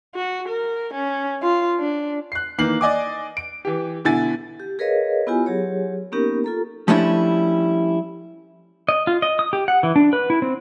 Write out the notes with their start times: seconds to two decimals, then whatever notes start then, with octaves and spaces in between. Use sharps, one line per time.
0.15 F#4
0.48 A#4
0.94 C#4
1.42 F4
1.80 D4
2.32 F#6 C7
2.58 D#3 E3 A#3 C7 F#7
2.81 D5 D#5 G#5 D6
3.37 D7
3.65 E3 G4
4.04 B2 D3 E4 G#5 A6
4.60 G4
4.79 G#4 A#4 B4 C#5 D#5 F5
5.27 B3 E4 F4 G4 G#5
5.46 F#3 G4 G#4 C#5
6.12 A#3 B3 C#4 D#4 G4 A#4
6.44 F4 A4 A#5
6.88 F3 G3 A3 C#4 D4 E4
8.89 D#5
9.07 F4
9.22 D#5
9.39 D#6
9.53 G4
9.68 F#5
9.83 E3
9.96 D4
10.13 B4
10.30 E4
10.42 C4